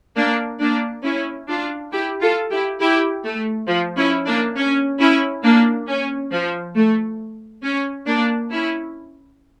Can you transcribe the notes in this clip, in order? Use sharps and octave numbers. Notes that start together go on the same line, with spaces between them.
A#3 D4
A#3 D4
C#4 E4
D4 F4
E4 G4
F4 A4
E4 G4
E4 G4
A3
F3
C#4 E4
A#3 D4
C#4
C#4 E4
A#3 D4
C#4
F3
A3
C#4
A#3 D4
C#4 E4